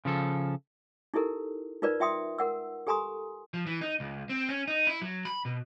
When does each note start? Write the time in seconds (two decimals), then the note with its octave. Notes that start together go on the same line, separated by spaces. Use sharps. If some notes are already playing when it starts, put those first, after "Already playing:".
0.05 C#3 F3 A4
1.14 D#4 E4 G4 A4 A#4
1.82 D#4 F4 A#4 B4 D5
2.00 F4 E5 G5 C6 D#6
2.38 A#4 F#5 E6
2.87 G4 A4 G#5 A#5 C6 D#6
3.54 F3
3.67 E3
3.81 D#4
4.00 C#2
4.30 C4
4.49 C#4
4.68 D#4
4.87 E4
5.02 F#3
5.25 B5
5.45 B2